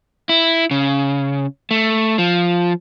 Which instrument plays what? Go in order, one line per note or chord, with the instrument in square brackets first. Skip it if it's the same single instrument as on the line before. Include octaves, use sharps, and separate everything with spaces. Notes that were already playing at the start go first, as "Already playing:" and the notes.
[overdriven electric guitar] E4
C#3
A3
F3